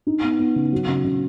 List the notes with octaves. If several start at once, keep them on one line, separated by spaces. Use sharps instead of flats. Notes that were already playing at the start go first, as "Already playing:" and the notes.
D#4
B3
B3
C#3
F#3
C#3
C#3